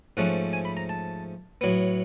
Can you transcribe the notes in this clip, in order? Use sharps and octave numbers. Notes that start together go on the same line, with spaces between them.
G#2 F3 A3 C#4 F#5
G#5
B5
A#5
A5
A2 F#3 B3